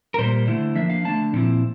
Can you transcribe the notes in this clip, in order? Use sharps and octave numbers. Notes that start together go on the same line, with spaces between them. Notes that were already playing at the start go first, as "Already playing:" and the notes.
A#4
A#2 G3 A#3 C5
D3 A3 E4
F3 A#3 D4 E5
F5
D3 A3 D4 A5
A#2 F3 C4 E4